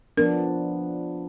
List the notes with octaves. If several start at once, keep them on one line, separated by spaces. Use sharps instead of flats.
F3 B3 D4 A#4